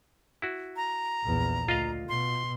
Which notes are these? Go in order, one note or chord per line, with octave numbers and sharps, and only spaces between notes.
E4 F#4
A#5
A#1 E2
D2 F4 D#5 F5
B2 C6